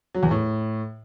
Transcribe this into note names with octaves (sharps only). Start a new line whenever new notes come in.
F#3
E2
A2